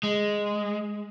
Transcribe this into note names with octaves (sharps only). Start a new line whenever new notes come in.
G#3